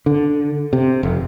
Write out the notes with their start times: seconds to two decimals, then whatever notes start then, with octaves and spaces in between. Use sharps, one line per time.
0.06 D3
0.73 C3
1.03 F1